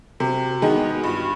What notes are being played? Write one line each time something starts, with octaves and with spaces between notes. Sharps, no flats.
C3 F#4
D#3 G#3 B3
G2 F4
F#4